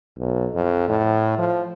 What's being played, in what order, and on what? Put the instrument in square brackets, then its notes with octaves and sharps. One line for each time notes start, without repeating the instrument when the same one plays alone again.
[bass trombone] B1
F2
A2
F3